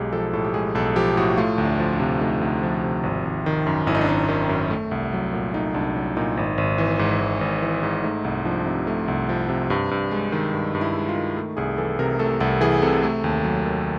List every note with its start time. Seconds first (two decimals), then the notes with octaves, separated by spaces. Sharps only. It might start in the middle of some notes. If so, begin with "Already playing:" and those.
Already playing: B1 G#3 G4 G#4
0.12 F3 A4
0.33 A2 A4
0.44 G4
0.54 G#3 G#4
0.75 B1 A4
0.96 F3 G4
1.17 A2 F#4
1.38 A3 F4
1.58 D2
1.65 D4
1.79 F3
1.93 D4
2.00 C3
2.21 A3 D#4
2.41 D2
2.63 F3
2.83 C3
3.03 G#1
3.25 G#1
3.46 D#3
3.67 F#2
3.87 G#1 E4
3.95 D#4
4.01 D4
4.08 G#1 D#4
4.28 D#3
4.49 F#2
4.70 A3
4.91 C2
5.13 F#3
5.33 A#2
5.53 A3 D#4
5.74 C2 D4
5.96 F#3
6.17 A#2 D#4
6.37 G#1
6.58 G#1
6.78 E3
6.99 G#2
7.20 G#1
7.41 G#1
7.62 E3
7.83 G#2
8.04 A3 D#4
8.24 C2 D#4
8.45 F3 D4
8.66 C3 D#4
8.87 A3
9.08 C2
9.29 F3
9.49 C3
9.70 G2
9.91 G2
10.11 G#3
10.32 D#3
10.53 G2
10.75 G2
10.81 E4
10.95 G#3
11.09 F4
11.16 D#3
11.37 A3
11.57 C2 G#4
11.78 E3 A4
11.99 C3 A#4
12.19 A3 A4
12.40 C2 A4
12.61 E3 G#4
12.82 C3 A4
13.03 A3
13.24 D#2
13.44 F#3
13.65 D#3